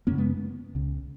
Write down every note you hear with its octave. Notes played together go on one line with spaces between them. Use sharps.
F#2 C#3 A#3 C#4
G#3 B3
C#2 C#3